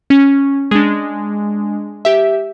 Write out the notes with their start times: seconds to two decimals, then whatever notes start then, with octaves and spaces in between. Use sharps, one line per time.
0.10 C#4
0.71 G#3 D4
2.05 G4 E5